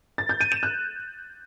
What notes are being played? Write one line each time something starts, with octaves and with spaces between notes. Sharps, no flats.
A6
G6
D#7
E7
F#6